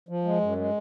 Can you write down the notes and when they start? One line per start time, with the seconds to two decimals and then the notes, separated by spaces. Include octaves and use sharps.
0.09 F3
0.24 G#3
0.41 F#2
0.58 G#3